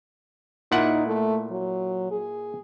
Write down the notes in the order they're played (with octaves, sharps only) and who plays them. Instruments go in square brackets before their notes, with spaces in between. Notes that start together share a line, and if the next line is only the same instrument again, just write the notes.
[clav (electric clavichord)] A#2 E4 F#5 [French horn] D#4
[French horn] A3
F#3
G#4